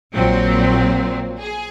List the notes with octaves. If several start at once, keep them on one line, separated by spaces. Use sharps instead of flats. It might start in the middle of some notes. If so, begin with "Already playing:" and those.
A#1 A#2 F#3 C4
G#4